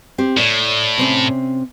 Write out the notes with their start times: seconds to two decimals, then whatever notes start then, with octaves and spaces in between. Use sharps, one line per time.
0.18 C4 G4
0.37 A2 C#5 D5
0.98 C3 C4 C#4